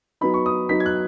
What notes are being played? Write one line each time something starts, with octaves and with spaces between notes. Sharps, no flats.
F#3 B3 D#4 B5
C#6
D#6
F#3 B3 D#4 B6
G#6
F#6